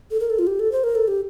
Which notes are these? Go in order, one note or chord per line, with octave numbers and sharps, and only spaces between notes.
A4
A#4
A4
F4
G4
A4
C5
A#4
A4
G4